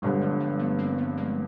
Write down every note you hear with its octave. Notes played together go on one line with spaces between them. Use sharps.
G1 G2 D3 F#3 G#3
F3 G3
G3 A3
A3 B3
A#3 C4
A3 B3
G#3 A#3